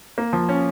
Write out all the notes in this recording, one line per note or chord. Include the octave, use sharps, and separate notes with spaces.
A#3
F3
C#4